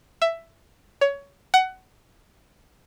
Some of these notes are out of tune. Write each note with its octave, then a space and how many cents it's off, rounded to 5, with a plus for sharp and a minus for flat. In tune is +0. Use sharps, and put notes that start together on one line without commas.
E5 +10
C#5 +20
F#5 +20